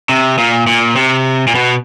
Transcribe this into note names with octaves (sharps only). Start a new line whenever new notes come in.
C3
A#2
A#2
C3
A#2
B2